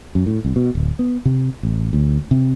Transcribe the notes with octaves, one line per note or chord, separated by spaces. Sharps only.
F#2
A2
C2
B2
D1
B3
C3
A1
D2
C3